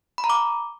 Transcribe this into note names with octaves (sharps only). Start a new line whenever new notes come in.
B5
A#5
D6